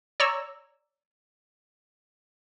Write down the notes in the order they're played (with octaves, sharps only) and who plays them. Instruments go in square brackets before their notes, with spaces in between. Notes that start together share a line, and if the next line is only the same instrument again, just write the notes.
[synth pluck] C#5 D5 A#5 E6